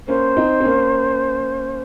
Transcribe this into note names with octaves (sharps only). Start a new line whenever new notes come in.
A#3 C#4 C5
C4 D#4
C4
A#3 C#4